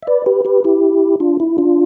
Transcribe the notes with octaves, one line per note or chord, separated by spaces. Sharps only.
E5
B4 D5
G4 B4
G4 B4
E4 G4
D4 F4
E4
D4 F4